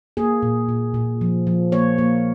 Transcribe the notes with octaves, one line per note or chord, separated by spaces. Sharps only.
A#3 G#4
A#2
A#2
A#2
F3
F3
A#3 C#5
A#3